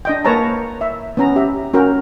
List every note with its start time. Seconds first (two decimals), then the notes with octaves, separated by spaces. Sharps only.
0.05 D4 D#5 G5
0.25 A#3 A#4 B4 C#5 A5 A#5
0.81 E5
1.17 B3 C#4 A#5
1.36 G4 E5
1.74 C#4 F#4 A#4 G5